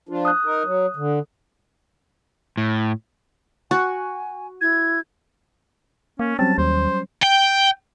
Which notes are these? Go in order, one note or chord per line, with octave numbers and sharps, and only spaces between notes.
F3 D4 F4
D#6 F#6
D#4 A#4
F#3
D3
A2
F#4 G#5
E4 G#6
A#3 C#4
F#3 G3 C4 C#4 A5
D#2 C5
G5